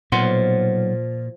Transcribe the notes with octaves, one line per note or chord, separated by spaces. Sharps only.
B1 A#2 F3 F#5 C6